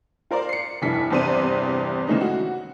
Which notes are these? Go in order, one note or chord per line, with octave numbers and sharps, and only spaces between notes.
F4 A#4 C5 D5
C7 C#7
F1 G2 E4 B6
E2 G2 C3 C5 D5 D#7
C#3 E3 G#3 A3 C#4 D#4
F#4